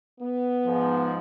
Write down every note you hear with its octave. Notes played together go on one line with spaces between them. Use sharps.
B3
G#2 F3 G#3